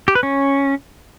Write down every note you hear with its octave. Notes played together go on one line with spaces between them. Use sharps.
G4
B4
C#4